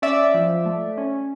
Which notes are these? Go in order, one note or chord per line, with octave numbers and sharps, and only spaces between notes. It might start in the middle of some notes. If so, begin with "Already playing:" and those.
C#4 D5 E5
F3
A3
C#4